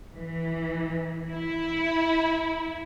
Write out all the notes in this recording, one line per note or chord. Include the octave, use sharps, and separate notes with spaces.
E3
E4